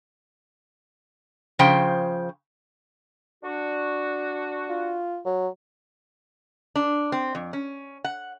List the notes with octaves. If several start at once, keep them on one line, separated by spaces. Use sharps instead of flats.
C#3 F3 C5 G5
D4 F#4
F4
F#3
D4
C4
F2
C#4
F#5